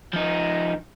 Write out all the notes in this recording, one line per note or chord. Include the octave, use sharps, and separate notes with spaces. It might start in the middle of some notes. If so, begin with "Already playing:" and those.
F3 D#4